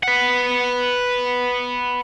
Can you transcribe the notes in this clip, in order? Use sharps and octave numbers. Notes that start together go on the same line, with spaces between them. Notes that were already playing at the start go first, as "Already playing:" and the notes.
B4 F#5